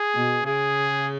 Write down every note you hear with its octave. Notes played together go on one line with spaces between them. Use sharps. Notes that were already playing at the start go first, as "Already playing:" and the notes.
Already playing: G#4
B2
C#3 G#4